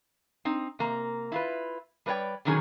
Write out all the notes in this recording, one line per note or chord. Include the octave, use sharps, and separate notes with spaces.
C4 D#4
C3 A#3 A#5
E4 F4 B4
G3 A3 B4 C#5 D5 G5
B2 D3 D#3 F#3 C#4 G#4